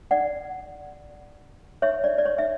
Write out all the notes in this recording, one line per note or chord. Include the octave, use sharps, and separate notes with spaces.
D5 F#5
C#5 E5
D5
D5
C#5
E5